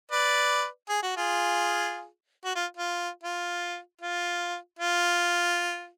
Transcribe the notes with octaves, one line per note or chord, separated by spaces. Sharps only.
B4 D5
G#4
F#4
F4 G#4
F#4
F4
F4
F4
F4
F4